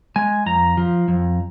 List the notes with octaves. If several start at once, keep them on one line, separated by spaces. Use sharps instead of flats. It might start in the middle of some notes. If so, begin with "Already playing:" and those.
G#3 G#5
F2 A#5
F3
F2